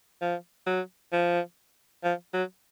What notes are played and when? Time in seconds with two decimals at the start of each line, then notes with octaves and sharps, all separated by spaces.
0.21 F3
0.67 F#3
1.12 F3
2.04 F3
2.34 F#3